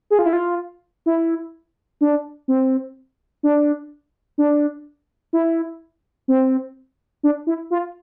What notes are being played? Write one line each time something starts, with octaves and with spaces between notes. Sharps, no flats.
G#4
F4
E4
F4
E4
D4
C4
D4
D4
E4
C4
D4
E4
F4